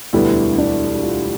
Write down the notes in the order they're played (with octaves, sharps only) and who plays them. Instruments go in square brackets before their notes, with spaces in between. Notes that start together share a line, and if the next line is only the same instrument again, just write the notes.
[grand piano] E1 D2 D3 G3 B3 [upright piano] E4
[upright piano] D4
F4